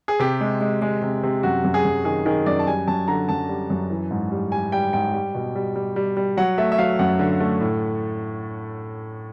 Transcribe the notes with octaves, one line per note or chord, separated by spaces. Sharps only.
G#4
C3 G4
G#3
G#3
G#3
C3
C3
F#2 F#4
F#2
G#4
F#2
D#3 G#4
D#3 G#4
F#2 D5
A5
G3 G#5
F#2 A5
D3 A#5
F#2 A5
G3
F#2
E3
G#2
G3
G3 G#5
G3 G5
G#2 G5
G3
B2
G3
G3
G3
G3
F#3 F#5
A3 E5
E5
F#3 F5
F#2 F#5
D3
A3
A2